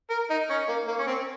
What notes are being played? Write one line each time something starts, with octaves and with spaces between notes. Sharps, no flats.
A#4
D#4
C#4
A#3
A#3
C#4
C4